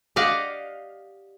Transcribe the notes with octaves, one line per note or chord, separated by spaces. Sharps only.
G4 D5 D#5 F5 F#5